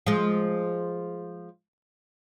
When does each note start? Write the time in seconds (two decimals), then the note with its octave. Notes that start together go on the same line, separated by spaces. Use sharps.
0.07 F3 G#3